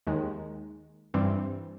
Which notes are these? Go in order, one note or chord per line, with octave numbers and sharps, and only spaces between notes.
D#2 D#3 G#3
G2 E3 G3 C4